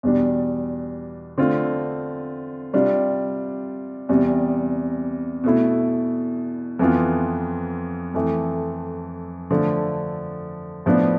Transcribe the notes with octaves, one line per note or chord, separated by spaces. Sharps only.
E2 B2 G3 D4
D3 A3 C4 F4
C3 G3 D4 F4
E2 C3 G3
B2 A3 E4
F2 E3 B3 F4
F2 E3 A3
D3 F3 A3
A2 F3 B3 D4